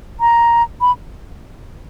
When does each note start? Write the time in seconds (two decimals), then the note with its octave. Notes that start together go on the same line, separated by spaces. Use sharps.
0.20 A#5
0.81 B5